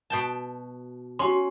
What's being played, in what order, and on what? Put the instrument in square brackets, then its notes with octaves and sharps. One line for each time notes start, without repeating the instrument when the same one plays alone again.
[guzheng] B2 G5 A5
[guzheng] C#4 [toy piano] F#4 F#5 C6